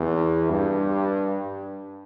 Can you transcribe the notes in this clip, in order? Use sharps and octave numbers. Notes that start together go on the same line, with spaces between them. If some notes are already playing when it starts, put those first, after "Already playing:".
Already playing: E2
G2